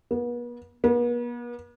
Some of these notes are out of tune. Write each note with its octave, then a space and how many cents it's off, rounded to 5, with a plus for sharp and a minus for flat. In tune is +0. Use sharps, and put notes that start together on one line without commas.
B3 -40
B3 -45